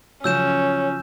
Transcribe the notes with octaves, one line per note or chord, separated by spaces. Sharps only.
C#3 F3 F#3 C#4 C#5 E6 G6 E7